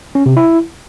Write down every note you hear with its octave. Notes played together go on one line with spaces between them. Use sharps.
C#4
C3
E4